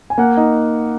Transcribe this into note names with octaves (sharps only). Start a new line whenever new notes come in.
G#5
A#3 F#5
D#4